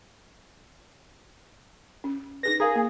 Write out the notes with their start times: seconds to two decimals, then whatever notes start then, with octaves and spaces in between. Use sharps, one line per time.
2.04 C#4
2.43 D#4 G#4 B4 A#6
2.60 G#4 A#4 F5 A#5
2.76 A#3